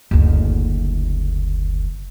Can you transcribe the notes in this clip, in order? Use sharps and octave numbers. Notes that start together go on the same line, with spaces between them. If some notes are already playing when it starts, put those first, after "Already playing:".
F#1 D2